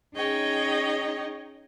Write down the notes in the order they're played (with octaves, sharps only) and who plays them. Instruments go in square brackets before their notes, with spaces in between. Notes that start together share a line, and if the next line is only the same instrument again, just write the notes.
[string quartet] C#4 D#4 G#4 C#5 D#5 G5